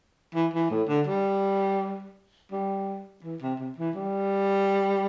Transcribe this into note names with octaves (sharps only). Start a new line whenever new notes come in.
E3
E3
A2
D3
G3
G3
E3
C3
C3
E3
G3